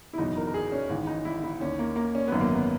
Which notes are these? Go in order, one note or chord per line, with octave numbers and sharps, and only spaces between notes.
E4
F#1 E2 B2 D#4
A#4
A#4
G#4
C#4
G#1 G#2 E3
D#4
E4
E4
D#2 D#3 C#4
A#3
A#3
C#4
G#1 F#2 D#3 B3
A#3
B3